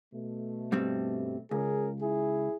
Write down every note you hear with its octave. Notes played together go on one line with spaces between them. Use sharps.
B2 A3
G2 G3 C4
C#2 C#3 G#4 A#4
E4 G#4